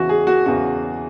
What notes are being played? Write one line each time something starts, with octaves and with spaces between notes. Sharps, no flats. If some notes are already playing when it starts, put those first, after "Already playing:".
Already playing: E2 C#3 E3 F#4
G#4
F#4
E2 C#3 E3 F#4